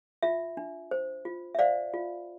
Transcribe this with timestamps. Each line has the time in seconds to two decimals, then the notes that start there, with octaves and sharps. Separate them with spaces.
0.23 F4 E5
0.57 D4
0.91 C5
1.25 F4
1.55 E5
1.59 C5 D5 F5
1.94 F4